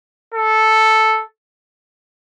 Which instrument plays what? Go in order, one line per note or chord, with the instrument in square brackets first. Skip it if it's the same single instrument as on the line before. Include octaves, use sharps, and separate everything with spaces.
[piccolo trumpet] A4